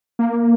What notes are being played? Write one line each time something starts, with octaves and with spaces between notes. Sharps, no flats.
A#3